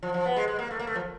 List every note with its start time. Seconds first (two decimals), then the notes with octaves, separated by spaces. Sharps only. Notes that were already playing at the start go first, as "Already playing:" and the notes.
0.03 F3
0.14 F3
0.26 B3
0.36 G#3
0.48 G#3
0.59 A#3
0.71 A3
0.79 A#3
0.87 A3
0.96 F3